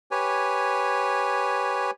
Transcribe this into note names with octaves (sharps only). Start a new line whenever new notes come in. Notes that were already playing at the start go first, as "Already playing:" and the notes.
G4 B4 C#5 G#5